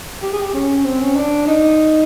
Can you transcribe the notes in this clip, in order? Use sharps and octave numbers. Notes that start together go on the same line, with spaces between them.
G4
G#4
G4
C#4
C4
C#4
D4
D#4